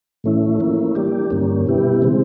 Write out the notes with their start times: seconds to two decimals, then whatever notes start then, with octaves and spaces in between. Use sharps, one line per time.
0.24 A2 E3 A3 C#4 E4
0.60 F3 A#3 C#4 E4
0.95 E3 G3 A#3 D4 G4
1.30 G2 D3 G3 A#3 C#4
1.66 B2 G3 B3 E4 G4
2.02 C#3 E3 G#3 C4